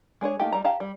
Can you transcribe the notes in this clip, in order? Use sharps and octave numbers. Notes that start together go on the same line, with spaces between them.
G#3 D4 G#4 C#5
A3 A#3 D#4 F4 G4
G3 A#5
G4 F5 A5 A#5
G3